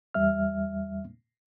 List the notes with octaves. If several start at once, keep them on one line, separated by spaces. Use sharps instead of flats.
E2 G3 E5 F6